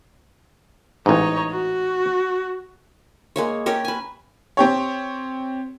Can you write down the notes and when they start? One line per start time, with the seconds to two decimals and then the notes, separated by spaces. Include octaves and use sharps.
1.06 A1 G#2 D#4 C#5
1.50 F#4
3.36 G#3 A#3 C#5
3.66 C#4 G4 A#4 C#5
3.85 B4 G#5
4.57 C4 G4 C#5